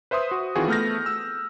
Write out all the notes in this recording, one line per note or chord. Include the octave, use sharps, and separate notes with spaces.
B4 C5 E5 C6 D#6
F#4
D#3 E3 C4 F4 F#4 G#4
A3 B3 F6 G6 A#6
E6